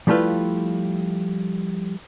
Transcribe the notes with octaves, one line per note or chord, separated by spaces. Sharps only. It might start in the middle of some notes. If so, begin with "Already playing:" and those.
F3 G3 A3 E4 F4 B4